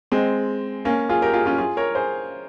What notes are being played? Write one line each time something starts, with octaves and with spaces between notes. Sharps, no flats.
G#3 C4
A#3 C#4
F4 G#4
G4 A#4
F4 G#4
C#4 F4
F4 G#4
A#4 C#5
G#4 C5